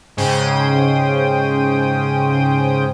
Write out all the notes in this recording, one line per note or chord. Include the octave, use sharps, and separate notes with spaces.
G#2 C#3 C#4 C5 G5 D#6